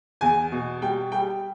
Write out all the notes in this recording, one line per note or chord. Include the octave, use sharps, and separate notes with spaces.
E2 G#5
B2
G3 G5
G3 G5